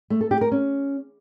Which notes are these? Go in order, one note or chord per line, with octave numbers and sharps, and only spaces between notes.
A3
A4
G4
A#4
C#4